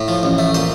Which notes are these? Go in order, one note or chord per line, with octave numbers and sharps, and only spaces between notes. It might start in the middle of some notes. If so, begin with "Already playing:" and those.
Already playing: A2
F3
A1
A3
A#2 C5